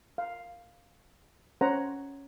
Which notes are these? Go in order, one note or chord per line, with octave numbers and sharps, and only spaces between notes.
F5
C#4 C5 C#5 F#5 A#5